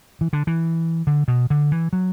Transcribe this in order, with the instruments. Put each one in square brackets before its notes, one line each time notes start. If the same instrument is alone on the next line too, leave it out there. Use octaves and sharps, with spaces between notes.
[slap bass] E3
D3
E3
D3
B2
D3
E3
F#3